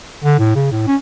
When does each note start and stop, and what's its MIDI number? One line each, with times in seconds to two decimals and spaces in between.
0.24 0.38 50
0.39 0.55 45
0.55 0.70 49
0.72 0.83 45
0.87 0.96 61